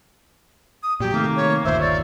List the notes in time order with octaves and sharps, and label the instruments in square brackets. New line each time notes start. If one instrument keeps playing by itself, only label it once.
[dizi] D#6
[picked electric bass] A#2 F#3 [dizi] G4
[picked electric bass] C3 D#3 A3 [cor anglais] A#3
[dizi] C#5
[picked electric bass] G1 D#2 A#2 [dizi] C5 [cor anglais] E5
[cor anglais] C#5 [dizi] D5